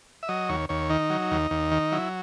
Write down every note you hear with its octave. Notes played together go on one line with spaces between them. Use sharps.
E5
F#3 D#5
D#2 C#5
D#2 C#5
D#3 D#4
F#3
D#2
D#2
D#3
F#3 E4